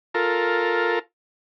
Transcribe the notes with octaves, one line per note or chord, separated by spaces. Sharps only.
F4 A4 A#4